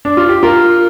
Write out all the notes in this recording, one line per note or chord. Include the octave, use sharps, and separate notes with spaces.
D4
F4
G4
F4 A#4